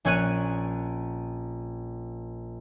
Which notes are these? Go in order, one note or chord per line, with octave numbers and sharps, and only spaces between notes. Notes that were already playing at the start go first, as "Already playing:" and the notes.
A#1 C#4 C#5 F#6 D#7